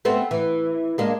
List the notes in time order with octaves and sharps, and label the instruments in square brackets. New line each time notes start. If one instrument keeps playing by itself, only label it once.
[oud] A3 B3 C4
E3
G#3 A#3 D4